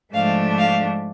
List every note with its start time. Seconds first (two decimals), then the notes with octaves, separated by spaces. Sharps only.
0.13 G#2 F3 A3 D4 F5
0.58 F5